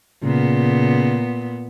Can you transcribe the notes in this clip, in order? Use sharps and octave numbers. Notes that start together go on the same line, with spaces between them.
A#2 C#3 B3